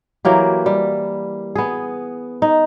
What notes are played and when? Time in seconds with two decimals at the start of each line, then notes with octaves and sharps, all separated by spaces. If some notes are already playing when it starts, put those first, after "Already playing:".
0.25 E3 F#3 A#3 G4
0.66 G3
1.56 B3 G#4
2.42 D#4